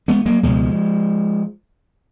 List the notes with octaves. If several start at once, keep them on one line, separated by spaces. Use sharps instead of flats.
G#3 B3
F#3 A#3
C#2 B2 F3 G#3